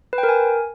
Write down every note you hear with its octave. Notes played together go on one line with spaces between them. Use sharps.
B4
G5
A#4
G#5